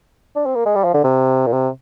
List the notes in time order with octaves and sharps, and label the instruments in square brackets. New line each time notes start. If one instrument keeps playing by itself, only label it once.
[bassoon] D4
C4
A#3
G#3
G3
F3
D3
C3
A#2
C3